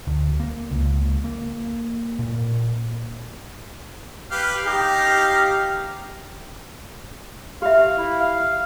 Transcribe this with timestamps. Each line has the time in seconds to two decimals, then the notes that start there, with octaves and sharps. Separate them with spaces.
0.07 D2
0.40 A#3
0.71 C#2
1.24 A#3
2.19 A#2
4.31 G4 B4 F5
4.66 D#4 G4 F5 A#5
7.62 G4 E5 F5
7.98 E4
8.20 F5